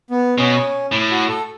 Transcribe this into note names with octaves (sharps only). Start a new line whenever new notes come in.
B3
B2 C#4
A2
F#4
A4